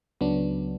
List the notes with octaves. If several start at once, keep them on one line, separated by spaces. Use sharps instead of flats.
C#2 C#3 F#3 B3 D4